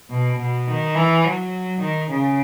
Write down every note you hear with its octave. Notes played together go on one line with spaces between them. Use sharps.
B2
B2
D#3
E3
F#3
D#3
C#3